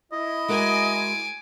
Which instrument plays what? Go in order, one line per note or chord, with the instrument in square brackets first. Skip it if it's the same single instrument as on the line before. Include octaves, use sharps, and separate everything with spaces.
[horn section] E4 [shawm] D#5
[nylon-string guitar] G#3 F#4 A#4 [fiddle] G#5 D6